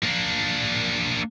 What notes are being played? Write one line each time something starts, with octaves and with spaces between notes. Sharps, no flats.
A#3 D4